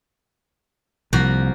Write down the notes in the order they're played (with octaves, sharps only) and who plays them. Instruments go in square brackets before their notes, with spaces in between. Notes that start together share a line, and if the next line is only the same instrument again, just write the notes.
[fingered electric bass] C2 [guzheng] F3 A#3 F#4